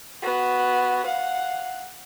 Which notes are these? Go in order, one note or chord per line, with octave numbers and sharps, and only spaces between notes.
B3 F#4
F5 F#5